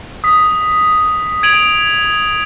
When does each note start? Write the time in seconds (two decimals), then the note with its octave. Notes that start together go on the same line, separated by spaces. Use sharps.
0.24 D#6 B6
1.43 G#6 D7 D#7 F7 F#7